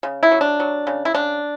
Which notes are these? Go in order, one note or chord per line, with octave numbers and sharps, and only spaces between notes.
C#3
E4
F#3
D4
F#3
C#3
E4
C#3 D4